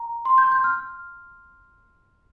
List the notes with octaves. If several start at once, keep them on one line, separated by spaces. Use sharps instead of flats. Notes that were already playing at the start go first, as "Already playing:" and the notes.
Already playing: A#5
C6
G6
G6
F6